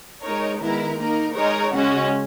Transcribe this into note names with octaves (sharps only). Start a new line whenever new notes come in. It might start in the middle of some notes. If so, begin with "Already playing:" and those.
G#3 D#4 A#4 C#5
D#3 G#3 B3 E4 A#4
A#3 D#4 A#4
G#3 D#4 A#4 C#5
C#3 G#3 C#4 F#4